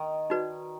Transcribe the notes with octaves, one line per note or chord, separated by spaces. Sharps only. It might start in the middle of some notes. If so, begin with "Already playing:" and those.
Already playing: D#3
D#4 F#4 B4 D5